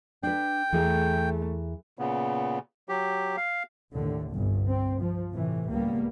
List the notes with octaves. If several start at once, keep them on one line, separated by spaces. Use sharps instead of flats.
D4 B4 G5
E2 E3 A3 G#4 A#4
A#2 C#3 B3
F#3 G4
F5
D#2 A2 D3
G1 C2 G2
C4
F3
A2 C3 E3
C#2 A2 G3 A#3 B3